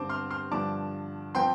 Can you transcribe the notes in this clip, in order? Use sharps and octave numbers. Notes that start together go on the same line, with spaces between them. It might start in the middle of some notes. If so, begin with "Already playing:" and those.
Already playing: G2 D3 G3 C4 C5 A5 D6
C6 F6
C6 F6
G2 D3 F3 D4 A5 D6
F3 C4 G5 C6